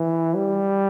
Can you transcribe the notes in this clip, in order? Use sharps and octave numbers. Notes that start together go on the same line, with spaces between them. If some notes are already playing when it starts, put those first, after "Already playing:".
Already playing: E3
G3